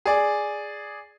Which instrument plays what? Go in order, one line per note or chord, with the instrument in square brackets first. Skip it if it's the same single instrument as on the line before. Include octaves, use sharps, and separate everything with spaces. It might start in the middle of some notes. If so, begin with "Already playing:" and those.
[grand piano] G#4 D5